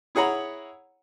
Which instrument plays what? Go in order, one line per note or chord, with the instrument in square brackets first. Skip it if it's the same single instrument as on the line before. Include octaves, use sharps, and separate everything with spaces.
[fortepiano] E4 G#4 C#5 F#5 A#5 B5